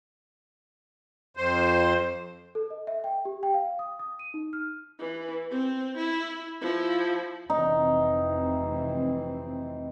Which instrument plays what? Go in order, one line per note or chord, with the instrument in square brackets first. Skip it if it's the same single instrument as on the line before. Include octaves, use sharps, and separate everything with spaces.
[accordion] F2 C5
[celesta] A4
D#5
E5
G5
G4
G5
F5
D#6
D#6
D#7
D#4
F6
[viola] E3
C4
E4
F3 E4
[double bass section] F1 E3 C4 [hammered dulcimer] D#4